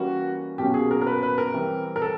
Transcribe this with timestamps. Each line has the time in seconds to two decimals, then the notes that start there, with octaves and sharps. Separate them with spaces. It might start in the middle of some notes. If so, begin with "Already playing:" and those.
Already playing: E3 G3 A#3 C#4 F#4
0.58 B2 F#3 A#3 C#4 G4
0.74 G#4
0.91 A#4
1.02 A#4
1.06 B4
1.23 B4
1.38 A#4
1.54 E3 G3 C4
1.96 A#4
2.02 A4